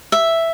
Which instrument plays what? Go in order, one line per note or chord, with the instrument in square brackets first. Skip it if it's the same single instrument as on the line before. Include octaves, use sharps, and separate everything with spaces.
[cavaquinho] E5